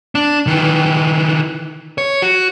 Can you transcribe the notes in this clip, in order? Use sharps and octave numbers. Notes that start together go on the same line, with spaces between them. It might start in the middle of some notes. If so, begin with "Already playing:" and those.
D4
D#3 E3
C#5
F#4